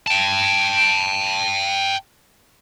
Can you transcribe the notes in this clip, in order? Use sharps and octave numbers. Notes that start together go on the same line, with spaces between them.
G5 A5